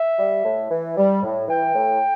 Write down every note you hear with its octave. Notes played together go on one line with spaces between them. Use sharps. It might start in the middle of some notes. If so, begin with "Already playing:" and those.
Already playing: E5
G3
A2
E3
G3
A2
E3 G5
A2